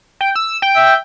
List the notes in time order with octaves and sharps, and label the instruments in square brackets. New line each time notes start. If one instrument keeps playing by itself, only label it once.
[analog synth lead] G5
E6
G5
[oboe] E5